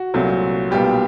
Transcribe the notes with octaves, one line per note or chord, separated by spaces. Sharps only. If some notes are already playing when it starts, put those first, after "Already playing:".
Already playing: F#4
C2 A#2 F#3 A3 C4
B1 A#2 G3 B3 G4